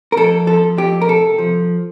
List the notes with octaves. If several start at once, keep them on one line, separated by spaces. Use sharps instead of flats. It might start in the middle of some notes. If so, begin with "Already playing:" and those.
A#4
F2 A4
F3 A4
F2 G4
A#4
C3 A4
F3